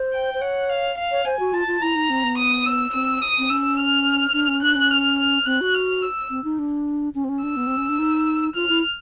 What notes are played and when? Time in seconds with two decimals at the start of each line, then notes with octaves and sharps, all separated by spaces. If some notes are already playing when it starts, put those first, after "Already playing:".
Already playing: C5
0.13 G5
0.34 C5
0.41 C#5 F#5
0.69 F5
0.97 F5
1.11 C#5
1.25 C5 G#5
1.40 F#4
1.53 F4 A5
1.67 F4
1.82 E4 A#5
1.95 D#4
2.10 C4
2.24 B3
2.38 D#6
2.66 E6
2.93 C4 E6
3.22 D#6
3.38 C4
3.50 C#4 E6
3.78 F6
4.33 D4
4.48 C#4
4.62 D4 F#6
4.76 C#4
4.90 F6
5.18 F6
5.46 C4 F#6
5.61 F#4
5.74 F6
6.02 E6
6.30 C4
6.44 D#4
6.59 D4
7.15 C#4
7.24 C4
7.29 C#4
7.43 D4 E6
7.57 B3
7.67 C4
7.77 C#4
7.89 D4
7.99 D#4
8.55 F4 F6
8.69 E4